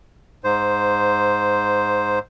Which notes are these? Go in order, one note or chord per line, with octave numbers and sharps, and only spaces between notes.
G#2 C5